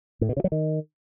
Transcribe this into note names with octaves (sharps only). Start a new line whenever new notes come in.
A2
B2
C#3
F#3
D#3